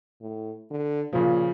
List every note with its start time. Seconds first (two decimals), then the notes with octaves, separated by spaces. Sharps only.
0.21 A2
0.71 D3
1.13 A#2 C#3 F3